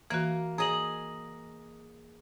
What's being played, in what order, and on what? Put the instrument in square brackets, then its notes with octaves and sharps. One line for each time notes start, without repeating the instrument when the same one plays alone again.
[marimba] E3 F#4 [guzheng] A#3
[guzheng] G#4 D#5 [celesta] A#5 F#7